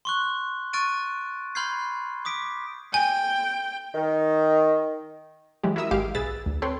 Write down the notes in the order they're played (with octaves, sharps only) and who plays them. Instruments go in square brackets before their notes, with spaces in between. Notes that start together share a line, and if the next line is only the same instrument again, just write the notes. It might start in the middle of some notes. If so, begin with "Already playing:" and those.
[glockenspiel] C6 C#6 F#6
C#6 F6 F#6 A6 D7 D#7
B5 C6 F6 G6 G#6 C7
D6 D#6 B6 D7
[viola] G5 [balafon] G#5
[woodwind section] D#3
[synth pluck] E3 F#3 G#3 G4
E4 F#4 A#4 E5 D#6 E6
G#1 G#3 G4 F5 F6 D7
B1 G#4 B4 E6 A6
D2
C4 A4 B4 C#5 G5 C6